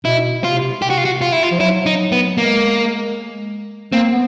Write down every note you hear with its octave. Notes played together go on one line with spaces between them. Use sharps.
B2 E4
C3 F4
C3 G4
F#4
F4
F#4
F4
E4
F4
F3
F#3 E4
D#4
B3
G#3 A#3
A#3 C4
B3